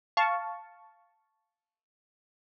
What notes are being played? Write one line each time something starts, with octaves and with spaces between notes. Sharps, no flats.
F5 A5 C#6